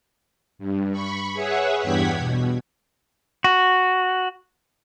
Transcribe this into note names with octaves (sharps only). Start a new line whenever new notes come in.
G2
B5 C#6
G#4 B4 C#5 E5 F#5
E2 G2 G4 F#5 G#6 B6
B2
F#4